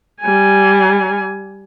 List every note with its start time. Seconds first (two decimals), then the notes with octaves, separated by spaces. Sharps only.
0.22 G3 G#5